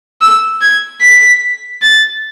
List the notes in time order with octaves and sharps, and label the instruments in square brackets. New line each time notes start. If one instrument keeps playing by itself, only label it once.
[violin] E6
G#6
B6
A6